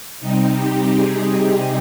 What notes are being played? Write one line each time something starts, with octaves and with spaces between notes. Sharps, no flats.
C3 G3 C4 D#4
G4
G#4